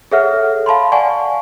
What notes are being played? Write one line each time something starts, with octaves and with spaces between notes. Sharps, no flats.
G#4 A4 C#5 E5 F#5 F6
F5 A5 B5 C6
D5 F5 F#5 G#5 A5 C#6